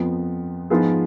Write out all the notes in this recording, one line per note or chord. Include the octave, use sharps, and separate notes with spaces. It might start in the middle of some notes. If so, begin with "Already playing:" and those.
Already playing: F2 F3 B3
G#2 F3 B3 F4 G#4